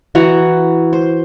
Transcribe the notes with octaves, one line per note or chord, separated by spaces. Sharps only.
E3 F#4 F#5 A#5
C5